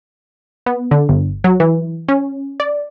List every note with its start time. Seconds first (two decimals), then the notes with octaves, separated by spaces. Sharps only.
0.66 B3
0.91 D3
1.09 G1
1.44 F#3
1.60 E3
2.08 C#4
2.60 D5